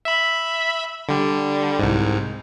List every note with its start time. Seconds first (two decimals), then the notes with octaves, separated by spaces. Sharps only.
0.05 E5 B5
1.09 D3 G3
1.79 C2 G#2